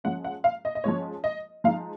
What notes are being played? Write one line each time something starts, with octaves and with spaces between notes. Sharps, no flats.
F3 G#3 C#4 F#5
F#5
F5
D#5
D#5
F3 G#3 C#4 C#5
D#5
F3 G#3 D#4 F5